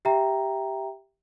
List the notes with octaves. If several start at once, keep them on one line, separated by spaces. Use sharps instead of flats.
G4 E5 G5 A#5